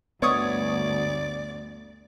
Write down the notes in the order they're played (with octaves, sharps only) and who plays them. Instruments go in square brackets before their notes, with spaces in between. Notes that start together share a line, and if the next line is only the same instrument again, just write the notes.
[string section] D2 G2 [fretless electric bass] B3 [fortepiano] C#5 C#6 D#6 [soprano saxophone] D5